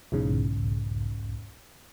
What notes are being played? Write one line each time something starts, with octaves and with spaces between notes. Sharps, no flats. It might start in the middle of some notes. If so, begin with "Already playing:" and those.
B1 E2 G#2 C#3